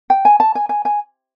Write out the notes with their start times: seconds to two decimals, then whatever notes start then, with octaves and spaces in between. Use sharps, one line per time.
0.10 G5
0.25 G#5
0.40 A5
0.55 G#5
0.69 G#5
0.85 G#5